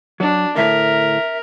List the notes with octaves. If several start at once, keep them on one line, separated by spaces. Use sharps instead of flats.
F#3 D4
D2 A2 A3 A#4 E5